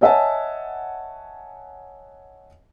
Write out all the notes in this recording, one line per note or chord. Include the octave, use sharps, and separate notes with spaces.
C#5 D#5 E5 F#5 G#5 A5